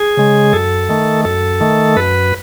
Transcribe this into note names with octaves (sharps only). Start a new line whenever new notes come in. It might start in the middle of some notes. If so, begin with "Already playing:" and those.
Already playing: G#4
C#3 G#3
F#2 A4
D#3 A3
F#2 A4
D#3 A3
F#2 B4